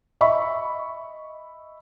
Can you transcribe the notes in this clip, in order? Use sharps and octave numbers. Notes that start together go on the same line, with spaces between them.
D#5 E5 B5 C#6